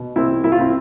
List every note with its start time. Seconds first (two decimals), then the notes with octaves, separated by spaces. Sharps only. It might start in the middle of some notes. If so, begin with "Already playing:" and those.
Already playing: B2
0.16 C2 C4 E4
0.44 C2 E4
0.52 F4
0.59 C4 E4